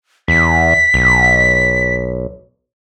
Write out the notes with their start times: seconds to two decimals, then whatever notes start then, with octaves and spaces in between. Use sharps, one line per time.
0.28 E2 B6
0.94 B1